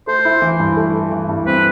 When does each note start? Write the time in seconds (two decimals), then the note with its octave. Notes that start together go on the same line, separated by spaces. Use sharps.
0.07 A3 C5
0.25 E4
0.42 E3
0.60 G2
0.77 A3
0.94 E4
1.12 E3
1.29 G2
1.46 C4 B4